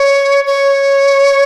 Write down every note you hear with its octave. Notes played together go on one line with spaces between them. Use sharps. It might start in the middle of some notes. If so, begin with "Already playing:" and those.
Already playing: C#5
C#5